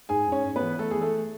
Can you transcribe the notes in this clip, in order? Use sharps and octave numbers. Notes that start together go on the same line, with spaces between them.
G#2 G#4 G#5
G#2 C#4 C#5
G#2
B3 B4
E3
A3 B3 A4
G#4
E3
A3 A4